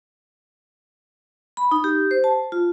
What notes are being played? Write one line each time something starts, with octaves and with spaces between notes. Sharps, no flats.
B5
D#4
G4
C5
A5
F4